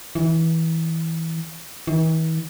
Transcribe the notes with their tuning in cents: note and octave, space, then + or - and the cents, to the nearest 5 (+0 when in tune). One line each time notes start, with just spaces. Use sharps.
E3 -20
E3 -45